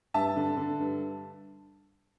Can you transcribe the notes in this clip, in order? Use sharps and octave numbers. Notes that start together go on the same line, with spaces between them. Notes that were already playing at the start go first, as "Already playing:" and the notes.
G2 E5 A5
D3
D3
G2